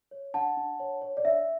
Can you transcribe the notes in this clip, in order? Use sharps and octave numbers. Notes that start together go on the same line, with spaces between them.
C#5
D4 F#5 A5
D4
C#5
C#5
D5
D4 E5